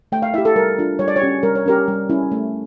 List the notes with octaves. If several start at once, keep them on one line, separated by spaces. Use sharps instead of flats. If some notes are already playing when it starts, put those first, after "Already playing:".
A3 G5
F5
E4 G4 E5
A4
G3 A#4
D4 F4
G3 C#5
D5
C#5
C#4 G4
G3 A#4
C#5
C#4 G4 A#4
G3
C#4 E4
A3